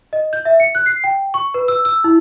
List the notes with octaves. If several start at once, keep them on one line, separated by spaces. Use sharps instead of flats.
D#5
G6
E5
C#7
F#6
C7
G5
C#6
B4
E6
E6
E4